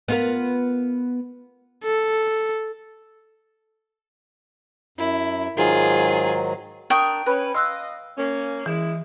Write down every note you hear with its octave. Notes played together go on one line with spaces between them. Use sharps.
B3 F4 A#4
A4
F#2 E4
G#2 D#3 F#3 F4 G#4
D4 A#4 G5 C#6 D#6
C#4 B4
D#5 F5 C6 E6 F#6
A#3 C#4
E3 G#3 E4